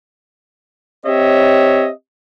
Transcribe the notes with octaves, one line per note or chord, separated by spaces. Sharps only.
C4 G4 C#5 D#5 E5